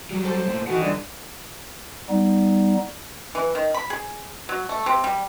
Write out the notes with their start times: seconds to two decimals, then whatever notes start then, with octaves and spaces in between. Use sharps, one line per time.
0.11 F#3 G3
0.24 A4 C5
0.46 A#2 A3
0.67 D#3 E3 F#4 F#5
0.81 G2 D3 D4
2.09 G3 B3 D#4
3.35 E3
3.55 D#3
3.74 B5
3.90 G#4
4.49 F#3
4.69 A3
4.86 C3
5.04 G3